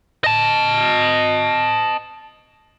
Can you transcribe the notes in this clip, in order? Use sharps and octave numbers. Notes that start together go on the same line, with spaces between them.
D#5 A5